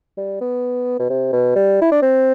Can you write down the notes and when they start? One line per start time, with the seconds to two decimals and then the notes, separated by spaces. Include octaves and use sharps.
0.17 G3
0.41 B3
0.99 B2
1.10 C3
1.33 B2
1.56 G3
1.81 E4
1.92 D4
2.02 C4